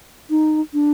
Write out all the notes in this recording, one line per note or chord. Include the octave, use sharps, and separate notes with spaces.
D#4
D4